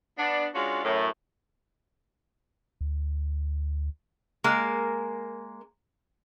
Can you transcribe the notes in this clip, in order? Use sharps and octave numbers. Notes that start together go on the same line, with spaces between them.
B3 D4
G#3 C#4 D4 F4 F#4
F#2 A2
D2
G#3 A#3 A#4